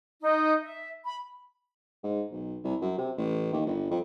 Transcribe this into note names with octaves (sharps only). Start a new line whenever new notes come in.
D#4
E5
B5
G#2
B1
C2
F#2
C3
A1
D#2
G1
F2